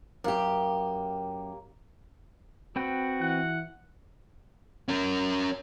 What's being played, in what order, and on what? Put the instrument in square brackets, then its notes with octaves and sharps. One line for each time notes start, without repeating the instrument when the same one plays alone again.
[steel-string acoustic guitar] F#2 G4 [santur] A#3
[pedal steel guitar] C4 B4 G5 [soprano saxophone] F#4
[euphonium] E3 [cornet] F#5
[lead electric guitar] C#4 A#4